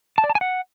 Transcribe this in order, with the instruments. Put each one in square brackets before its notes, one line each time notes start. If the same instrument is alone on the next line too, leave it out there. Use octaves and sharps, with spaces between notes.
[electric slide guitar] A5
D5
A5
G#5
F#5